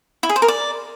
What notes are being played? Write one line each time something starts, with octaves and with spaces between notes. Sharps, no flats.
E4
G#4
C5
A#4
D5